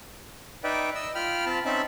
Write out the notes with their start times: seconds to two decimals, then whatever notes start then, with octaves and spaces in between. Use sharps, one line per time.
0.64 D#4 B4 D5 E5 G5
0.95 D#5 E6
1.15 F4 G5 B5 F6
1.46 C4 F4 A5 B5
1.65 C4 C#4 D#4 E5 A5 B5